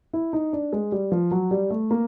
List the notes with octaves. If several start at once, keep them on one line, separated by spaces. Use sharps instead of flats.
E4
D#4
D4
G#3
G3
F3
F#3
G3
A3
A#3